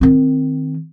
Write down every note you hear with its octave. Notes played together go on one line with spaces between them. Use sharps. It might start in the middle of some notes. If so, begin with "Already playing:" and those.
D#3 C4